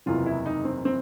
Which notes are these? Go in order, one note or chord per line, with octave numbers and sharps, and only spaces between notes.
F#1 E2 C3 E3 F4
E4
D#4
C4
C4